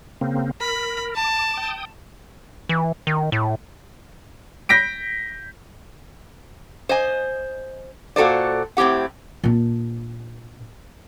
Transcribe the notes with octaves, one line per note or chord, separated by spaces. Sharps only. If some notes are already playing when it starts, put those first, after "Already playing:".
C#3 A#3 C4
A#4 B5
A5 D6
G5 D#6
E3
D#3
A2
G6 A#6 B6 D7
C5 D#5 G#5
A#2 F#4 A4 C5 D5
A2 C4 E4 G4 F#5
A#2 D4